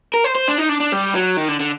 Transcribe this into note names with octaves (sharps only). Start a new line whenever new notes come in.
A#4
C5
C5
D4
D#4
D4
D4
G3
F#3
D#3
D3
D3